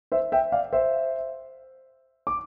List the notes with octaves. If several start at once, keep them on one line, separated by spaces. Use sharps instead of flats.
C5 E5
E5 G5
D5 F5
C5 E5
D6